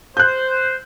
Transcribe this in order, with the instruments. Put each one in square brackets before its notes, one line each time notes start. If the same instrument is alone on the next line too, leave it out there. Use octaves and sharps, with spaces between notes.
[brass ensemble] C5 [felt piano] F#6 G6